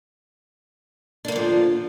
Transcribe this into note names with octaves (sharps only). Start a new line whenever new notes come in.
D3 F3 A#3 D4